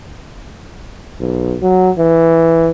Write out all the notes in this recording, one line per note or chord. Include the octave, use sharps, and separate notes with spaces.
B1
F#3
E3